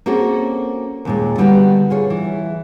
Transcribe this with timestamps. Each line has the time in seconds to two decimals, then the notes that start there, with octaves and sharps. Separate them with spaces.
0.06 A#3 C4 C#4 F#4 G#4 A4
1.05 D#2 A#2 G#3
1.38 D3 G3 B3 D#4 F#4
1.90 F4 G#4 C#5
2.10 E3